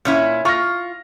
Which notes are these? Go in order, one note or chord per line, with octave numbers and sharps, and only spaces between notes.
A#2 C#4 E4
F4 C#6 F6 A#6